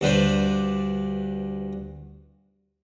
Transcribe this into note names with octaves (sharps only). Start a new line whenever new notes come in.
D2 G2 D4 B4 C5 D5